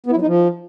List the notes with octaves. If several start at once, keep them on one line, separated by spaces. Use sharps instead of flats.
B3
E4
F#3
D#4
F3